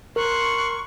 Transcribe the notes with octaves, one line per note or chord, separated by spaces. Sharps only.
A#4 C6 C#6 F#6